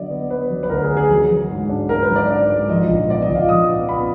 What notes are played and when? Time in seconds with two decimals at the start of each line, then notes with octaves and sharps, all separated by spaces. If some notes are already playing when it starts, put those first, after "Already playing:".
Already playing: D3 F#3 B3 D5 D#5
0.10 B3
0.30 B3 B4
0.50 F#3
0.63 B4
0.70 D2 A#4
0.83 G#4
0.89 D3
0.97 G#4
1.10 F#3
1.29 F#3
1.50 G#2
1.69 D4
1.89 G#2 A#4
2.03 B4
2.09 F#3
2.16 D5
2.29 D4 D5
2.49 G#2
2.69 F3 D#5
2.89 A#1
3.09 B3 D5
3.22 D#5
3.29 A#1
3.35 F5
3.49 F3 D#6
3.68 B3
3.89 B3 B5